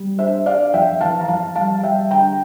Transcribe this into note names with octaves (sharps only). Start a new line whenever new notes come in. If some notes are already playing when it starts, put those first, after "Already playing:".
Already playing: G3
D4 C5 E5
D4 D5 F5
F2 E5 G5
E3 F5 A5
A#5
F2 F5 A5
G3 F5 A5
G3 E5 G5
D3 G5 A#5